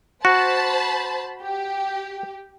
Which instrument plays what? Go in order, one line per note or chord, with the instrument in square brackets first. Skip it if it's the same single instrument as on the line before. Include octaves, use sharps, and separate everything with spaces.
[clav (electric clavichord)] F#4 [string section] C5 A5 B5
[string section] G4